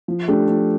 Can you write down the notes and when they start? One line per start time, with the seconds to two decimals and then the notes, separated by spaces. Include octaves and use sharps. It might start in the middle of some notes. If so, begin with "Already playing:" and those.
0.08 F3
0.28 A3 D4 G4
0.48 F3